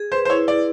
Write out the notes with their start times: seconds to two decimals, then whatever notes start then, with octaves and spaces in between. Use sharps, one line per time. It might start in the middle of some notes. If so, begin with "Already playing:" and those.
Already playing: G#4
0.12 B4 C5
0.25 C5
0.29 E4 C#5
0.47 E4 D5